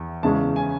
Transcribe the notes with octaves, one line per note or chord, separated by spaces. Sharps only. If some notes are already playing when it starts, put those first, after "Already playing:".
Already playing: E2
E2 C#3 G#3 C#4 E4 A5
G#5